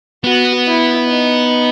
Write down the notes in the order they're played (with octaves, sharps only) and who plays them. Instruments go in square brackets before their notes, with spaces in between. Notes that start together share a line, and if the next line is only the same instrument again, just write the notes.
[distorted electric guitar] B3 [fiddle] F#4
[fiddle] E4
D#4